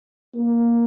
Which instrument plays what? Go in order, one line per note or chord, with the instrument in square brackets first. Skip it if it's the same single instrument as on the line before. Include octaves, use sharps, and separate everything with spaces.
[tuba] A#3